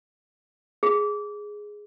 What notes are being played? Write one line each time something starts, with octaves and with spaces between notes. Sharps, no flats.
G#4